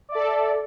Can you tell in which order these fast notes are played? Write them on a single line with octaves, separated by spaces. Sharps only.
D5 E5 A4